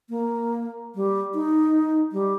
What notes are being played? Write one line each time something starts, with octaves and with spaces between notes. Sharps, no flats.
A#3
G3
D#4
G3